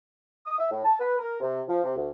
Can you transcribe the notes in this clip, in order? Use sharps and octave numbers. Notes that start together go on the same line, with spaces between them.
D#6
E5
A2
A5
B4
A#4
C3
F3
C3
D2